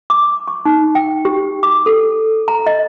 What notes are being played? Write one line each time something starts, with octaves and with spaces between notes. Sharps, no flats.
D6
C#6
D#4
G5
G4
D6
A4
A#5
D#5